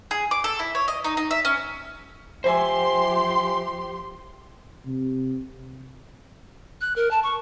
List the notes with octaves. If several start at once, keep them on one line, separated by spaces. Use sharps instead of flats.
G#4
D6
A4
E4
C#5
D#5
D#4
D#4
E5
C#4
F3 G4 C5 E5 G#5 C6
C3
F#6
A#4
A5
C#6